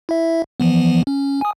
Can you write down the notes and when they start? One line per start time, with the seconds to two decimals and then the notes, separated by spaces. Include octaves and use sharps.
0.09 E4 E5
0.60 E3 F3 B3
1.07 C#4
1.41 G#5 D#6